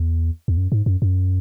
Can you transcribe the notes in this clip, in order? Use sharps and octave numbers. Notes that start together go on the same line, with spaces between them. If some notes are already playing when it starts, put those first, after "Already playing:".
Already playing: E2
E2
F#2
G#2
F#2
F#2